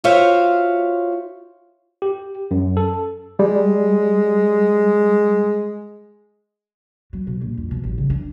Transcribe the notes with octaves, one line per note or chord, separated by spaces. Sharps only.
F4 F#4 C5 C#5 E5 F5
G4
F#2
A4
G3 G#3
F#3
B2
A#1
F2
B2
A1
C#3
D4